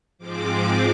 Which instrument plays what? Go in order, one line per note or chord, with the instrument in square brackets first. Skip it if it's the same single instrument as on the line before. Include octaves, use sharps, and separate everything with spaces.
[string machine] G#2 F3 G#3 C4 D6